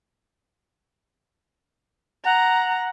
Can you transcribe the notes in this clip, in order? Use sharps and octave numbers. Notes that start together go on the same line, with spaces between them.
F#5 A#5